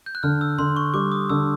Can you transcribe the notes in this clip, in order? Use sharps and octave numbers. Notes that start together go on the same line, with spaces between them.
G6
F#6
D3 F6
E6
D3 C6
C#6
G3 D6
D#6
D3 E6